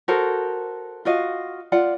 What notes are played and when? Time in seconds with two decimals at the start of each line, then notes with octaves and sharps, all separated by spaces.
0.08 F#4 A4 A#4 C5
1.05 F4 F#4 D#5 F5
1.72 F4 D5 F#5